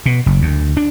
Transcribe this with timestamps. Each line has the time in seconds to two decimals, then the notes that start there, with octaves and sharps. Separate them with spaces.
0.06 B2
0.26 F#1
0.42 D2
0.77 D4